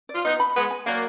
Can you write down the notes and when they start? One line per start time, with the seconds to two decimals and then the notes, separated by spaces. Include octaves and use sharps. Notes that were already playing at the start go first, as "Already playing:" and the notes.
0.09 D5
0.15 F4
0.24 B3 D#4 D#5
0.40 B5
0.56 G#3 B3 B4
0.71 G#5
0.86 F#3 A#3 D5